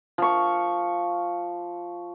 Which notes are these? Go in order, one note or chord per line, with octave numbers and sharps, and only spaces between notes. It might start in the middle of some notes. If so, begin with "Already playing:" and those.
F3 C#6